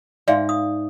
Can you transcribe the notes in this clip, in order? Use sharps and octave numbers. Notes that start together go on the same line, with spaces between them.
G#2 D5 E5 F5
D#6